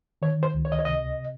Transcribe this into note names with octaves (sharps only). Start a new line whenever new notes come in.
D#3 C#5
C5
C#2
C#5
D#5
C#5
C3 D#5